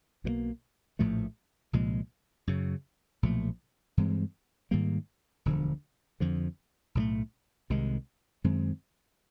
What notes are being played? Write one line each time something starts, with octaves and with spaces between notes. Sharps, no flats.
B1 B2 G3 A#3
A#1 A2 F3 A3
C2 A#2 F3 G#3
F#2 C#3 F#3
B1 A#2 F3 A3
G2 E3 G#3 C4
G#2 D#3 G3 A#3
E1 D2 D3 F3
F2 D3 F3
B1 A2 F#3 A3
C2 C3 D#3 G#3
F#2 D#3 G#3 C4